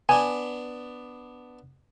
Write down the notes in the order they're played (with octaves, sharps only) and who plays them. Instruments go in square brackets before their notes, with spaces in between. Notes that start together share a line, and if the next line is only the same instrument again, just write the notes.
[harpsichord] B3 D4 [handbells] G#5